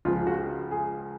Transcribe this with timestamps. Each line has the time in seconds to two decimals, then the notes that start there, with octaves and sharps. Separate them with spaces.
0.05 C#2 C#3 F3 F4
0.27 F#4
0.71 G#4